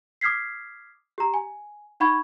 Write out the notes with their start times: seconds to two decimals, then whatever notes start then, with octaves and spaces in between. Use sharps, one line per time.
0.21 D6 D#6 F6 G#6 B6 C7
1.18 G4 A#5
1.34 G#5
2.00 D#4 F#5 B5 C#6 G#6